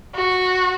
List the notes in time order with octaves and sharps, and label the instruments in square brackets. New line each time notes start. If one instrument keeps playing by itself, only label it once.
[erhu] F#4